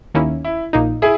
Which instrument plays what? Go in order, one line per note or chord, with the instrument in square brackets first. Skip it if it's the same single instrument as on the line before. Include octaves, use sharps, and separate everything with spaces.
[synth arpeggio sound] D#2 D#3 A#3 C#4 E4
[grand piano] E4
[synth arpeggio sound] A#1 A#2 A#3 D#4
[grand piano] E4 G#4